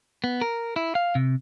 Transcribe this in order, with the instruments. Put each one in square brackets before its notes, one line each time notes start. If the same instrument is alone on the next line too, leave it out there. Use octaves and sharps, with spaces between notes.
[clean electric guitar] B3
A#4
E4
F5
C3